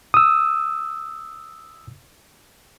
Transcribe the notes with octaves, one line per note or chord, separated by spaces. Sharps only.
D#6 E6